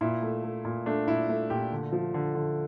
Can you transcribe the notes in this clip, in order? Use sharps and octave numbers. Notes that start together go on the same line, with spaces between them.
A#2 E4
A3
A3
A#2
A3 D4
A#2 E4
A3
A#2 G4
D3
F3
D3
D3